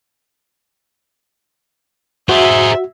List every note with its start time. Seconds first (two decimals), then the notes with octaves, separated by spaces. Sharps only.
2.29 F#4 G#4 C5 E5